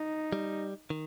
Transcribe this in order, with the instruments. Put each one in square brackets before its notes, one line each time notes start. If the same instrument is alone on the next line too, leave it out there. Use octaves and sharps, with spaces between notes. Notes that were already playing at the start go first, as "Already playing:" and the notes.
Already playing: [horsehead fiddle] D#4
[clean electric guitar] G3
D#3